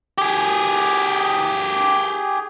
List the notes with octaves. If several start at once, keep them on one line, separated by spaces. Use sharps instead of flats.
G4 G#4